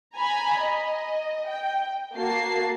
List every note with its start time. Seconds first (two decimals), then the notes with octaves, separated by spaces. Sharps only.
0.15 G#5 A#5 B5
0.60 D#5
1.47 G5
2.14 A#3 F#4 A5 C7